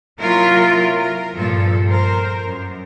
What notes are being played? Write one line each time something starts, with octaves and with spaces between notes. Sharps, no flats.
C3 F#3 A#3 E4 F4 A#4
A#4
G2 A#2 F3 A4
A#4 C5
F#2